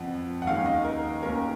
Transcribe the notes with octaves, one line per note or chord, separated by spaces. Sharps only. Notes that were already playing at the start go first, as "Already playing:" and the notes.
Already playing: F2 F3 B3 F#5
F#5
D#2 D#3 G#3 C#4 F5
D#5
A#4
D#2 D#3 A#3 C#4 A#4